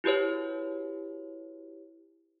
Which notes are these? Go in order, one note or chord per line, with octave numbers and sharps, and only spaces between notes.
E4 F#4 G4 B4 C#5